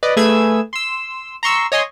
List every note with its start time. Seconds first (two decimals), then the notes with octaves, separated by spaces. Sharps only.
0.03 B4 D5 D#5
0.17 A3 G#4 B4 E6 G#6
0.73 C6 E6
1.43 A#5 C6 C#6 E6
1.72 C#5 D#5 G#5 C6